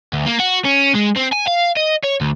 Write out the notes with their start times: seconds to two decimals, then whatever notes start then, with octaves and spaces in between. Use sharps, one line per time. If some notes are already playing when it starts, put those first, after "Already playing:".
0.13 D2
0.26 A#3
0.39 F#4
0.65 C#4
0.94 G#3
1.16 C4
1.32 G#5
1.47 F5
1.77 D#5
2.04 C#5
2.21 D2